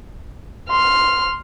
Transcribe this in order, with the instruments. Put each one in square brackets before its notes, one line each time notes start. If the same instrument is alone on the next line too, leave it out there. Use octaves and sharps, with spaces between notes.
[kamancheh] C6 [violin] F6